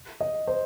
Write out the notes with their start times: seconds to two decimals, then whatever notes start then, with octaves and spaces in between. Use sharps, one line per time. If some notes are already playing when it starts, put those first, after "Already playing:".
0.21 D#5
0.47 C5